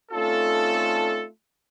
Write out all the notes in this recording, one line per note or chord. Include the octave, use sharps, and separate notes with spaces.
A3 C4 C#4 D#4 F4 A4